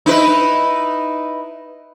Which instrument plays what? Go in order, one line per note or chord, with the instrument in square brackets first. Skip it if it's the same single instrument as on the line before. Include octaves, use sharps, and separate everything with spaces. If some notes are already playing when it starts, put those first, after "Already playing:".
[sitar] D#4 E4 B4